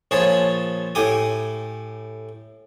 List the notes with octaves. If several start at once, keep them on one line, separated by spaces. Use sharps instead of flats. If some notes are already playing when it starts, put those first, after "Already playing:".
A#1 F3 G#4 C#5 A5
A2 G4 G#5 D#6